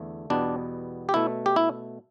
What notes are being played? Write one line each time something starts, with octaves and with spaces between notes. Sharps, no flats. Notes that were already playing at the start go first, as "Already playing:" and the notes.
Already playing: E2 D3 A3
E2 B2 G3 B3 D4
G4
B2 A3 E4
G4
E4